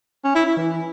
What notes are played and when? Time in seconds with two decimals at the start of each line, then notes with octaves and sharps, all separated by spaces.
0.24 C#4
0.35 E4
0.46 E4
0.57 E3